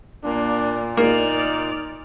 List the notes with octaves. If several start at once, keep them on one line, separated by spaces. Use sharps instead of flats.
A#2 A#3 D4
A#3 D#4 D5 F6